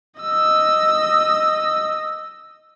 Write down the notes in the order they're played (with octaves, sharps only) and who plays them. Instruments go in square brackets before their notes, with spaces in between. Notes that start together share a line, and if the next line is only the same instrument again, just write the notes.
[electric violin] D#5 E6